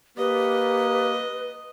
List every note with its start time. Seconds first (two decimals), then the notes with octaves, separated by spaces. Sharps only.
0.17 A#3 G4 B4 D#5